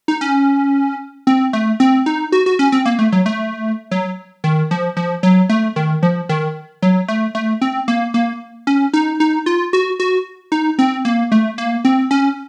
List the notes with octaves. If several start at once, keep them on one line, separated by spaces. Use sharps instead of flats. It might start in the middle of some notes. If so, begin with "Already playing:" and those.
D#4
C#4
C4
A3
C4
D#4
F#4
F#4
C#4
C4
A#3
A3
F#3
A3
F#3
D#3
F3
F3
F#3
A3
D#3
F3
D#3
F#3
A3
A3
C4
A#3
A#3
C#4
D#4
D#4
F4
F#4
F#4
D#4
C4
A#3
A3
A#3
C4
C#4